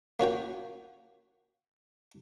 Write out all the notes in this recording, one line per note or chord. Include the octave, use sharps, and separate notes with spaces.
A#3 C#4 F#4 G5